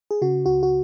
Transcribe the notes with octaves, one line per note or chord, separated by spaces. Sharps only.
G#4
C#3 F#4
C#2 F#4
F#4